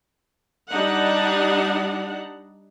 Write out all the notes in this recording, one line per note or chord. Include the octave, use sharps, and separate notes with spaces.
G3 D4 D#4 F#5